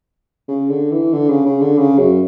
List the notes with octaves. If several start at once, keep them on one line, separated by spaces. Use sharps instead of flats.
C#3
D3
E3
D3
C#3
C#3
D3
C#3
F#2